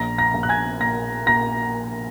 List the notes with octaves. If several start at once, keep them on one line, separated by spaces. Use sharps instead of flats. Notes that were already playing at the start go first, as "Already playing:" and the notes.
Already playing: A#1 A#5 A#6
A#5 A#6
A#1
F#6
G#5 G#6
A#2 A#5 A#6
A#2 A#5 A#6